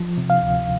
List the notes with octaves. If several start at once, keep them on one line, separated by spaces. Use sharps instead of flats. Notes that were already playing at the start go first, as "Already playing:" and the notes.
Already playing: F3
C3
F5
D2